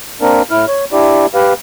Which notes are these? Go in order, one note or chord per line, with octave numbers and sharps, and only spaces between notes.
A#3 C4 D4 A#4
A2 E4 F6
C#5
D4 E4 G4 D5
G4 B4 F5